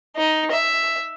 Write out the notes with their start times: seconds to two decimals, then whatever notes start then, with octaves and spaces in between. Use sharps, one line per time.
0.17 D#4
0.51 E5